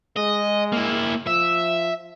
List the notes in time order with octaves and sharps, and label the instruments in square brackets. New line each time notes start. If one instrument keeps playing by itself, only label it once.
[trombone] G#3 [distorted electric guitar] D#5
[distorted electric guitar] A#3 E4
[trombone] F3 [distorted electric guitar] E5